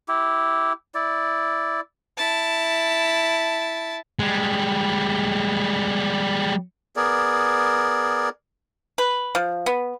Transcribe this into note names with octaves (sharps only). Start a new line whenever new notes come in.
E4 G4
E4 D5
E4 A5
G3 G#3
B3 G#4 A#4 D5
B4
F3
B3